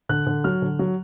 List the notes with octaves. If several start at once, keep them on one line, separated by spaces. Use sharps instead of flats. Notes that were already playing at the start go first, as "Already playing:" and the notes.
D3 F#6
D3
F#3 F6
D3
F#3